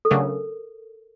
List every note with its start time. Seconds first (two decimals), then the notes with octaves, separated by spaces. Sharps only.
0.05 A4
0.10 C#3 F#3 A3 D4 A#4